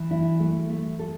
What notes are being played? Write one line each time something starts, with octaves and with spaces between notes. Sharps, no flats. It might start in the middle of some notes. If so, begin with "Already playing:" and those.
Already playing: E3
E4
A3
A3
A4